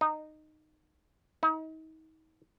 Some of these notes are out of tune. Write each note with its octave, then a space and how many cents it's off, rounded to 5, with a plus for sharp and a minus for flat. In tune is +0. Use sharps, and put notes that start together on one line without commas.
D#4 -15
D#4 +35